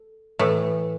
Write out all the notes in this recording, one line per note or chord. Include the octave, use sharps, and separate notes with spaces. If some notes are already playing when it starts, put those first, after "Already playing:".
Already playing: A4
A2 E3 A3